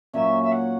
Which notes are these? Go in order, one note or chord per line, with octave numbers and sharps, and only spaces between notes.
A#2 F#3 C#4 E5
E5
F#5